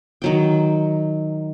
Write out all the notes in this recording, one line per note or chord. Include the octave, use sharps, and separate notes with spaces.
D#3 F#3 G5